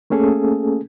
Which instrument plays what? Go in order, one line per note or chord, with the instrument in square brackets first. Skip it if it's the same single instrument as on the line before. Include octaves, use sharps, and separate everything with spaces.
[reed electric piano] A3 A#3 C#4 G#4 A4